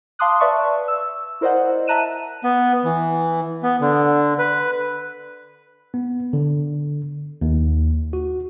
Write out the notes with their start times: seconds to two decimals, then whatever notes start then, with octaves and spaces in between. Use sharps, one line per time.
0.19 F5 A5 C6 D6 D#6 F#6
0.40 B4 D5 E5 A5 C#6
0.88 E6
1.41 E4 A#4 C5 D5 D#5 F#5
1.87 E5 A5 A#5 F#6 D#7 E7
2.44 B3
2.85 E3
3.63 B3
3.81 D3
4.38 B4
5.94 B3
6.33 D3
7.41 D#2
8.13 F#4